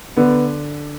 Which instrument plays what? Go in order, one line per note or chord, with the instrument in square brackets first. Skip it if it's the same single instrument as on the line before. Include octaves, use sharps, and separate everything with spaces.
[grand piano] D3 [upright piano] B3